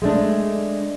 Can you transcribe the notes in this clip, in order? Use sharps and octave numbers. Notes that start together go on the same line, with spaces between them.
G#3 A3 D4